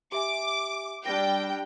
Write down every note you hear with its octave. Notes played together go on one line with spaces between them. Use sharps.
G4 E5 G#5 D6
G3 D4 G5 A#6